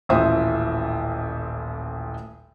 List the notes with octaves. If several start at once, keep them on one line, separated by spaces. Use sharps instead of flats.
D#1 A1 E3 C5 E5 D#6